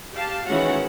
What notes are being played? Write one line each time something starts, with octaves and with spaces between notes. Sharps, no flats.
G4 F5 A5
D#3 E3 G#3 C#4 F#4 F#5